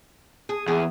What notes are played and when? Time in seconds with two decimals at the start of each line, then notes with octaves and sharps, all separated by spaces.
0.49 G#4
0.68 E2 G#4